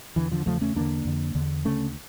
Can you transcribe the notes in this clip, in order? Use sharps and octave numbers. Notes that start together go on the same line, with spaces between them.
E2 D3 E3
D3 F3
E2 C#3 F3 A3
A3 C#4
E2 D3 A#3 D4
F2 D3
E2 D3
D2 C#3 A3 C#4